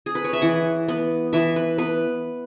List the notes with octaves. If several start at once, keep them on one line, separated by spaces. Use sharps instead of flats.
G#4
B4
C#5
E5
E3 F#5
B3
E3 E5
B4
B3 B4